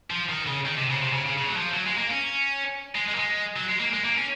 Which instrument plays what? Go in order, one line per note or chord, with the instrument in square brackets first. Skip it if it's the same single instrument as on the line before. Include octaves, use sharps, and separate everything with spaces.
[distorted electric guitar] F3
D#3
C#3
D#3
C3
C#3
C3
C#3
C#3
C#3
F#3
F3
F#3
G#3
A#3
C#4
G#3
G#3
A#3
G#3
F#3
G#3
A#3
G#3
A#3
C#4